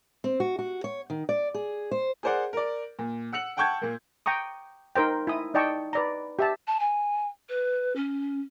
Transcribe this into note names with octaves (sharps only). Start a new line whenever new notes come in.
C4
F#4
F#4
C#5
D#3
D5
G#4
C5
G#4 A#4 C5 D5 F#5
A#4 D5
A#2
F#5 E6 C#7 F#7
F#5 G5 A5 C#6 G6 G#6
A#2 A#3
G5 A#5 C#6 D#6
D#4 A#4 C5 G5
E4 G#5 D#6
D#4 D5 D#5 G5 A5 C#6
B4 D5 A#5
G4 E5 A5
A5
G#5
B4
C#4